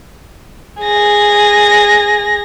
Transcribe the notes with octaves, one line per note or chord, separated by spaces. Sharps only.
G#4 A#6